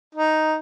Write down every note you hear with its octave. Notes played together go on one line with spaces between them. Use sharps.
D#4